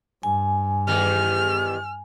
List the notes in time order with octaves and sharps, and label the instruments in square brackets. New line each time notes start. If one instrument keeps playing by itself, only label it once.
[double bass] G2 [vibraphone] G#5
[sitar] E2 D#3 G3 [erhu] F6